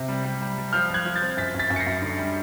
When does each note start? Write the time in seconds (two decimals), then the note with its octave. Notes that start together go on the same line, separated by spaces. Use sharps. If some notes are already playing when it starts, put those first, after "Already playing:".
Already playing: C3
0.08 G3
0.24 G3
0.41 G3
0.58 G3
0.73 F3 F6 G6
0.90 F3 F#6 G#6
1.05 F3
1.16 G6 A6
1.22 C4
1.37 F#2 A6 B6
1.54 F#2
1.59 A6 B6
1.70 F#2
1.76 C#7
1.80 A#6 C7
1.86 F#2
2.02 D3
2.19 G3